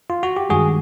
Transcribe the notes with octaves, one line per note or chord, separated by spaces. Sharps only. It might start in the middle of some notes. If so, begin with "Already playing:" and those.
F4
F#4
G4
G2 D#3 G#3 F#4 G#4